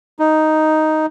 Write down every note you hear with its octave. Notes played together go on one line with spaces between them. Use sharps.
D#4